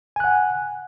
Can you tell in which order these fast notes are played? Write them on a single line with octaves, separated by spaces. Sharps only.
G#5 F#6 F#5